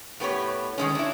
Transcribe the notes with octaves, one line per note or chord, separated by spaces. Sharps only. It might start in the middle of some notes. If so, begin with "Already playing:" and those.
A2 B3 G4 C#5
D#3 G#3 C#4
D4 E4